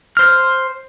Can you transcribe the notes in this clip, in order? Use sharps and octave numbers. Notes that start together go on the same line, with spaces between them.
C5 F6